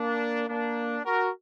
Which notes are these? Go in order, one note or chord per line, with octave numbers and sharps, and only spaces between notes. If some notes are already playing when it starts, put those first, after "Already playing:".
Already playing: A#3 D4
A#3 D4
F#4 A#4